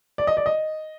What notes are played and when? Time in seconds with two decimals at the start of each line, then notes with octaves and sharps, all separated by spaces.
0.18 D5
0.27 D#5
0.37 D5
0.46 D#5